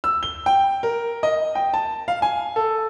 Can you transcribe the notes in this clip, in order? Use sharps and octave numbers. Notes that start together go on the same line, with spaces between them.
E6
G7
G5
A#4
D#5
G5
A5
F5
G#5
A4